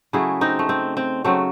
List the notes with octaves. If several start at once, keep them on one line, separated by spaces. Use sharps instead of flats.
C#3 F#3 A3 E4 G#4
C4 D#4
A3
C4
C4
C#3 F#3 A3 C4